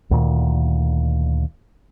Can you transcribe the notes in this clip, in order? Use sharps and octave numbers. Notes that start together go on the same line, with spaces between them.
D2 A#2 D#3